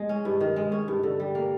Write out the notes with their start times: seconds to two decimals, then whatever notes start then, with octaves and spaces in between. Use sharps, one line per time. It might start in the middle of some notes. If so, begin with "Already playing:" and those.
Already playing: G#3
0.09 C#4
0.25 G2
0.41 D#3
0.56 G#3
0.72 C#4
0.88 G2
1.03 D3
1.20 G3
1.35 A#3